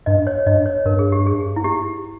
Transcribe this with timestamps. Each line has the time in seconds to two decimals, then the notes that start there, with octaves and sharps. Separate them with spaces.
0.06 G2 D#5
0.27 C#5
0.46 G2 D#5
0.66 C#5
0.85 G2 A#4
0.99 G#4
1.12 G4
1.27 G#4
1.56 E4
1.64 G4